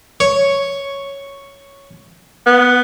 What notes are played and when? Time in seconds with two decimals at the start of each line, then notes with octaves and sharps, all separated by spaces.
0.20 C#5
2.46 B3